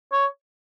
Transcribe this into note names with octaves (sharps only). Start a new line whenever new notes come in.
C#5